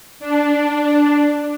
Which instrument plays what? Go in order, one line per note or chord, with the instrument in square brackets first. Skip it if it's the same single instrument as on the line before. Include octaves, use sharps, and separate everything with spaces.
[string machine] D4